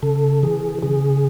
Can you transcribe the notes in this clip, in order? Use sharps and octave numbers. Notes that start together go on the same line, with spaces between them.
C#3 A4
E3 G#4
C#3 G#4